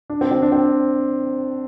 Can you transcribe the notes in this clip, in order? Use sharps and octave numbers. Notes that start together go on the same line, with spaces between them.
D4
C4
C4
D4
C4